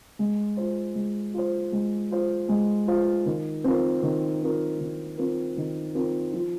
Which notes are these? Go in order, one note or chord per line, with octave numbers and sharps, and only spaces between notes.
G#3
F4 C5
G#3
F4 C5
G#3
F4 C5
G#3
F4 C5
D#3
C4 F4 A#4
D#3
C4 F4 A#4
D#3
C4 F4 A#4
D#3
C4 F4 A#4
F3